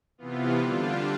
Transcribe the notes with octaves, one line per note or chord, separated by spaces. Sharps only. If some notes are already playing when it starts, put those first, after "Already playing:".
C3 E3 B3 F4
D3 G3 D4 F4